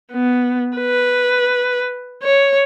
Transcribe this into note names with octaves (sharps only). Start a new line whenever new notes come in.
B3
B4
C#5